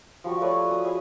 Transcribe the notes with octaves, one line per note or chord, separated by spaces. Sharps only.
F3 G3 F#4 C#6
A3 B4 C#5 D5
G#5 D#6
E4 G#4 C#5 G#5